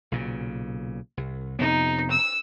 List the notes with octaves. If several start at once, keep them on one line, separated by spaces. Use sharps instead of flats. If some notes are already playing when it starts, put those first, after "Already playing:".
B1 A#2 C#3
C2
F2 C3 B3 D#4
E6